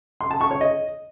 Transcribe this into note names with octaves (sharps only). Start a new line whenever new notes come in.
C6
A5
C#6
C#5
D#5